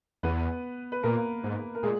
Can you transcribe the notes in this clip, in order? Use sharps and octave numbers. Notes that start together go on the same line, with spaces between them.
E2 B3 B4
B4
A#2 A#3 A#4
G#2
A#4
A#2 G#3 G#4